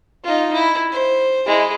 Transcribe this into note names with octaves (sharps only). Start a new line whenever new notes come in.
D#4 F4
E4
C5
G#3 E4